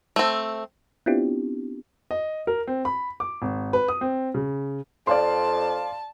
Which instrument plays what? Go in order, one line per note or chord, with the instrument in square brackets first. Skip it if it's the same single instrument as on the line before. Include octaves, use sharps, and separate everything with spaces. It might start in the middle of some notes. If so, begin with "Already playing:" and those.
[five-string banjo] A3 C4
[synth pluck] B3 C4 D4 E4 F4 G4
[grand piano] D#5
A#4
C4
B5
D6
G#1
B4
D#6
C4
C#3
[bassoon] F2 [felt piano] D5 F5 C6 [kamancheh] A5